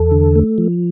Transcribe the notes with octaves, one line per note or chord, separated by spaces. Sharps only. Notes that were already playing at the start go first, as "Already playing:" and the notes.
Already playing: E2 A4
D3
A3
F3